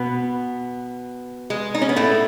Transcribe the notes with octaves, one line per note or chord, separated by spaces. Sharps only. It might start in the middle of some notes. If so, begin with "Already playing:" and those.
Already playing: B2 B3
G#3
D#4
C#4
B3
A2 A3